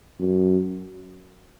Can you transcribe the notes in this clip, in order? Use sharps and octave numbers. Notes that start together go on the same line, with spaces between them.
F#2